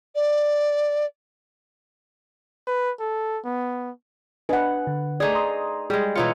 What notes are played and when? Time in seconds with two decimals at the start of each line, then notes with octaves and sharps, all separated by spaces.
0.15 D5
2.67 B4
3.00 A4
3.44 B3
4.49 D4 B4 D#5 F#5 G#5
4.87 D3
5.20 A3 D#4 G#4 D5
5.35 A#5 C6 D#6
5.90 G3 G#3 G#4
6.16 B2 E3 D#4 F4 C#5 C#7